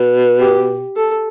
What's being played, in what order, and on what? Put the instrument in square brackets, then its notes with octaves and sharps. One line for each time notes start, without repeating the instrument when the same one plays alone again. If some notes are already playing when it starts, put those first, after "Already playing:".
Already playing: [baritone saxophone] B2
[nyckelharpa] G4
A4